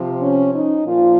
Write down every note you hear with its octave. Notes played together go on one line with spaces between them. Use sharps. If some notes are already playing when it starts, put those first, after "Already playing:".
Already playing: C3 F3
C#4
D#4
A#2 F3 F4